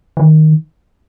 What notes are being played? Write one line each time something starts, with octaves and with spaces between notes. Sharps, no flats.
D#3